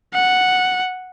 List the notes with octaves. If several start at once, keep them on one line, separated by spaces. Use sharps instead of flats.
F#5